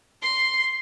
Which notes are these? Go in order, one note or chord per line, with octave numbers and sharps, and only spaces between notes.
C6 C7